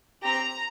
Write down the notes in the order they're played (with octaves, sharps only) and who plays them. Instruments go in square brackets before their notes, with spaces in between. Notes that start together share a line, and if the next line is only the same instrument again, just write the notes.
[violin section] C4 G4 A#5